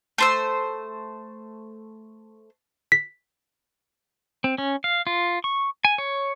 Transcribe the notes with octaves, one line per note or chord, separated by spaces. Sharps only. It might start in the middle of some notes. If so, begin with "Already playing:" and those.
A3 C5 E6
B6
C4
C#4
F5
F4
C#6
G#5
C#5